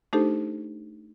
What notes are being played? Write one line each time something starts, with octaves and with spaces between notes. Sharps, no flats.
A3 D4 D#4 G4 A4 C5